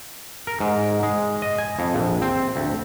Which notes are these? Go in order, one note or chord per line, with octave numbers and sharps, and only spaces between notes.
A#4
G#2
G#3
D#5
G#5
F2
A#1
C4
D2